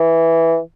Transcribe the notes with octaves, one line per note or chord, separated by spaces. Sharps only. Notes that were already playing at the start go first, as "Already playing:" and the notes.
Already playing: E3